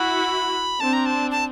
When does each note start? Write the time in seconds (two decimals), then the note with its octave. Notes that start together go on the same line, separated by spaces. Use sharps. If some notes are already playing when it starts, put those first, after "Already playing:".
Already playing: E4 F#4 B5
0.80 C4 D4 A5
0.93 A#5
1.06 A5
1.31 A5